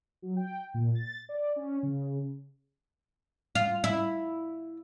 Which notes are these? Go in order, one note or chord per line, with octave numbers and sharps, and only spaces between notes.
F#3
G5
A#2
A6
D5
C#4
C#3
F4
E4